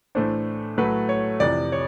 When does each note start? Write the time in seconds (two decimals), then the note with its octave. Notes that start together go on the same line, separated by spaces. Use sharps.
0.15 A2 E3 A3 D4 C5
0.78 A2 F#3 A3 B4
1.09 C#5
1.40 F2 C3 E3 D5
1.72 C#5